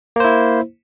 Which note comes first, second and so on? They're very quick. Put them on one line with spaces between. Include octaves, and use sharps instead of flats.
A#3 C5 E4